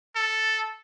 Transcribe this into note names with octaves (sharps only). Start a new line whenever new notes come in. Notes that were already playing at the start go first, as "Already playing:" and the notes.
A4